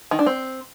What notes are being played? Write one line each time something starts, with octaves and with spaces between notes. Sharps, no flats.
D#3
D4
C4